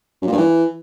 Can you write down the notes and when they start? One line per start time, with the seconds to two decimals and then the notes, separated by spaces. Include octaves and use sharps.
0.22 F#2
0.27 A#2
0.32 G2
0.37 E3